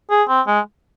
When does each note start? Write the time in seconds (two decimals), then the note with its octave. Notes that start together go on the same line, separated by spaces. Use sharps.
0.10 G#4
0.29 C4
0.47 G#3